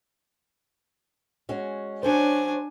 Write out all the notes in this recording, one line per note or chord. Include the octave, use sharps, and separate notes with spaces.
G#3 C#4 F#4
F#3 C#4 D4 C5 G#5